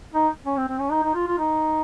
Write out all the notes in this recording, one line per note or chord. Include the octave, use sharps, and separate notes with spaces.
D#4
C#4
C4
C4
C#4
D#4
D#4
F4
F4
D#4